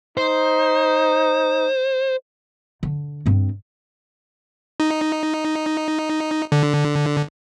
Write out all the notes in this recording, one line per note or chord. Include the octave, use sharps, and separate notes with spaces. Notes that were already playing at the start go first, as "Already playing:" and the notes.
D#4 C5
D3
G2 C4
D#4
D3